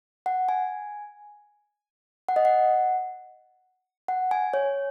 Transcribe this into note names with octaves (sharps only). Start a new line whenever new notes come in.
F#5
G#5
F#5
D#5
F#5
F#5
G#5
C#5